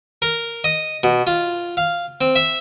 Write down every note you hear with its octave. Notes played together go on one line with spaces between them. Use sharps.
A#4
D#5
B2
F4
F5
C4
E5